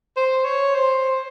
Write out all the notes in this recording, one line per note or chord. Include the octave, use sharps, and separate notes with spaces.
C5
C#5
C5